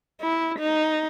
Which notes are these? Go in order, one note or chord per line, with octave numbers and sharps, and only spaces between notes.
E4
D#4